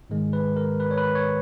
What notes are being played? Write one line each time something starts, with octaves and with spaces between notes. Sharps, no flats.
G#2 D#3 G#3
B4
A#4
B4
C#5
B4
C#5